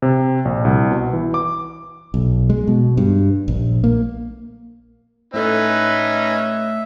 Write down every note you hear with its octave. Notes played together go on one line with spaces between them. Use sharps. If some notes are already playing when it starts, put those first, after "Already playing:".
C3
A#1
C2
B2
E3
D6
B1
G#3
B2
G2
A#1
A#3
A2 A3 C#4 D#4 B4 E5 A5